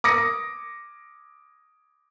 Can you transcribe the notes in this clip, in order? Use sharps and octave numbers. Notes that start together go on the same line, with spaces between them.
D6 D#6 A#6 C#7